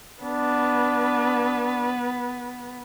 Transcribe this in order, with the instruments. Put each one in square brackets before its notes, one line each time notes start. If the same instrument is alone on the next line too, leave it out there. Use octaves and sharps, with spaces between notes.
[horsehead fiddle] B3 B4 [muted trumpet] D4